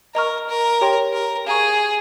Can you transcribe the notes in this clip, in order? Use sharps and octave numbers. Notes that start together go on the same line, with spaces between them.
A#4 D#5 A#5 C#6 F6
A#4
G4 C#5 G5 C6
A#4
G#4 F5 A#5 C#6